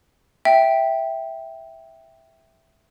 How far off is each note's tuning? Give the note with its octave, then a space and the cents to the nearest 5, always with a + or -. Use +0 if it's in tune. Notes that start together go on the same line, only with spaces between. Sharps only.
E5 +0 G5 +0